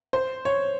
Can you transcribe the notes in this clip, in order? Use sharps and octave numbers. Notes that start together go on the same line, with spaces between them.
C5
C#5